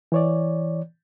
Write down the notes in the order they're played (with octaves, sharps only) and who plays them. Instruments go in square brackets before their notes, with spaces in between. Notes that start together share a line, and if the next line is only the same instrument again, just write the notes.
[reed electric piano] E3 C#5 D5